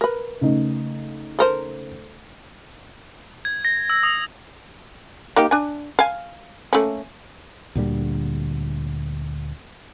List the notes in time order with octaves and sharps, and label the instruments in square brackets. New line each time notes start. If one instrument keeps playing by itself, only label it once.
[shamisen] A#4 B4
[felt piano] C#3 A3 D#4
[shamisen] A4 A#4 C5
[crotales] G#6
A#6
E6
D#6
[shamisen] A#3 D#4 G4
D4 G#5
F5 G#5
A3 A#3 C#4
[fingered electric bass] D2 A#2 D3 G3